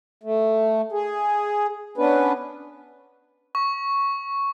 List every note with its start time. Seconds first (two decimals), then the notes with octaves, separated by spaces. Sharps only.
0.23 A3
0.92 G#4
1.98 B3 C#4 D4 B4
3.55 C#6